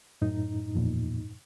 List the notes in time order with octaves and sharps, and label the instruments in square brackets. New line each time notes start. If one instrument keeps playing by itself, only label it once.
[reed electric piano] F#2 A2 D#4
[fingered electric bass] E2 A#2 F3